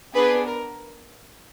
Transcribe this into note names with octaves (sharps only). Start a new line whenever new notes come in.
B3 D4 G#4 B4
A#4